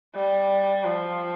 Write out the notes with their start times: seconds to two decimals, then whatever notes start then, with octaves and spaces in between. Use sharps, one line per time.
0.15 G3
0.84 F3